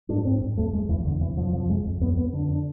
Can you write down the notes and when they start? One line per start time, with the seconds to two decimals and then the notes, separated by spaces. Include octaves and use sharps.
0.09 G#2 D4
0.25 G#2 C4
0.42 G#2
0.57 E2 A3
0.73 E2 G#3
0.89 E2 E3
1.05 E2 D3
1.21 C3 E3
1.37 F2 F3
1.53 C3 F3
1.69 F2 G#3
1.85 F2
2.01 F2 B3
2.17 F2 B3
2.33 D3 D4
2.49 D4